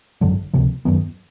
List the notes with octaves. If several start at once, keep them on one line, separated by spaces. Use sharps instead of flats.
G#1 F#2 D3 F#3
C#2 C3 F3 A#3
F#2 D#3 F#3 B3